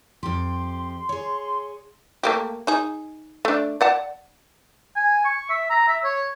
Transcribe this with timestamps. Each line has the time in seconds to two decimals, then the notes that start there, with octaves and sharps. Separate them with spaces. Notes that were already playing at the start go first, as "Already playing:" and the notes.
0.23 F2 G4 C6
1.09 G#4 C#5
2.23 A3 A#3 G4
2.67 D#4 G#4
3.45 A3 D4
3.81 D5 F#5 A5
4.96 G#5
5.25 C#6
5.49 E5
5.70 A#5
5.88 E5
6.04 C#5